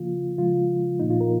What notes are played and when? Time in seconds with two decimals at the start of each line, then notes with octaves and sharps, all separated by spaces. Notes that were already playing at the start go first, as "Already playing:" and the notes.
Already playing: C#3 F3 A#3 F4
0.38 C#3 F3 G#3 F4
1.00 A#2 F3 A#3 D#4
1.10 F4
1.21 A#4